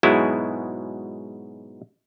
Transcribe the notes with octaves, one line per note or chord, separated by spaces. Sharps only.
G#2 B2 F#3 G#3 E4